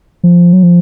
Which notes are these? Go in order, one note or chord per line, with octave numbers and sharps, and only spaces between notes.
F3
F#3
F3